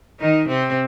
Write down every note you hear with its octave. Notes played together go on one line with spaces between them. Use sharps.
D#3 D#4
C3 C4